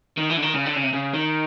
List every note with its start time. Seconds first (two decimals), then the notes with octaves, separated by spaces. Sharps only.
0.17 D#3
0.30 E3
0.37 D3
0.42 D#3
0.54 C#3
0.66 D3
0.76 C#3
0.83 C3
0.93 C#3
1.13 D#3